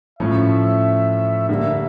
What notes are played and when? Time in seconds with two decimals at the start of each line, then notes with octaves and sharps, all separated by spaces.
0.19 A2 F3 C#4 E5
1.49 D3 G3 A#3 E5